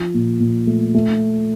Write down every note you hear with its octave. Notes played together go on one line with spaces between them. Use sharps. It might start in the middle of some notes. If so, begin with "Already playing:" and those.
Already playing: F3
A#2
A#2
A3
A3